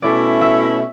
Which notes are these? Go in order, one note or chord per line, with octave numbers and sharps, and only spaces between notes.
B2 A3 C#4 E4 D5
E5